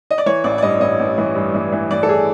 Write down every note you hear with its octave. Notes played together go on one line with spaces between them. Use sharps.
D#5
D5
E3 C#5
A1 D5
D5
G2 D#5
A1 D#5
A1
E3
G2
E3
E3
E3 D5
A4
G#4